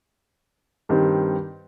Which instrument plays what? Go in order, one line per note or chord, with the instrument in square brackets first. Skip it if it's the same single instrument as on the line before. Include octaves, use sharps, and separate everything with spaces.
[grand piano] G2 D#3 G3 C4